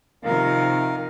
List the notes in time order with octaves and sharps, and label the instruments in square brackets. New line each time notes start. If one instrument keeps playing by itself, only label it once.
[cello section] C3 D#3 F3 [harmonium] A#4 F5